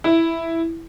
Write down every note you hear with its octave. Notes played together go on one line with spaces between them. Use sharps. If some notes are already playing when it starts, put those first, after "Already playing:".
E4